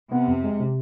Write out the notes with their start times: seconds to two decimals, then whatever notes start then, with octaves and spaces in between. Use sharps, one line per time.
0.11 C3 B3
0.28 F2
0.44 G#3
0.60 C3